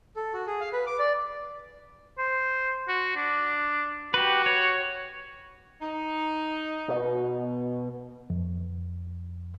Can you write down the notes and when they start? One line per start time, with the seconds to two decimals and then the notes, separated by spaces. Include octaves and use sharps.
0.16 A4
0.34 F#4
0.47 G#4
0.61 F5
0.73 B4
0.86 D6
0.99 D5
2.19 C5
2.88 F#4
3.16 D4
4.14 F#4 G4 B4
4.46 C#5
5.82 D#4
6.88 B2
8.30 F2